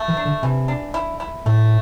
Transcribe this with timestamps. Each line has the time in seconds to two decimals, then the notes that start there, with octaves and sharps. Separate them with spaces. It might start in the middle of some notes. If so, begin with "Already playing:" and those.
Already playing: A3
0.08 E3
0.17 D4
0.25 D3
0.42 C3 E3
0.68 D4
0.94 E4
1.20 E4
1.46 A2 A3